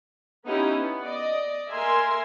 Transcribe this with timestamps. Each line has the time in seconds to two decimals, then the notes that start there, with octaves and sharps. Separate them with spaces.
0.44 B3 C#4 D#4 E4 G4
0.74 B3
1.04 D5 D#5
1.70 A#3 A#4 E5 G#5 C6